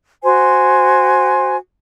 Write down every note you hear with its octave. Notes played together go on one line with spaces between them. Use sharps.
F#4 C5 G#5